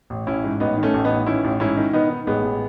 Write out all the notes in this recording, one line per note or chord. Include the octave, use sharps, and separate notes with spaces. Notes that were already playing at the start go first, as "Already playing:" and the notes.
A1
A1 C#4 E4
G#2
A1 B3 D#4
D#3
A3 C#4
A1
B3 D#4
A1
D#3 C#4 E4
A1
G#2 C#4 E4
D#3
D#3 B3 D#4
D#3
A1 G#3 B3
A1